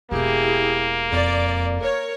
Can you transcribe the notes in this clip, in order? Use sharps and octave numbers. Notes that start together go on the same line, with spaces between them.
E1 A#3 E4 G4 G#4
F2 D5
A#4 C#5